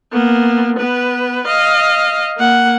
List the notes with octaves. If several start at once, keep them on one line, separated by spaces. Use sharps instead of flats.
A#3 B3
B3 B4
D#5 F5
A#3 F#5